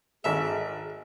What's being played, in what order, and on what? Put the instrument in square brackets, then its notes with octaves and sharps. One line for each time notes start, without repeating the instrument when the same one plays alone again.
[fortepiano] G#1 A4 [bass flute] G#4 [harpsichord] E5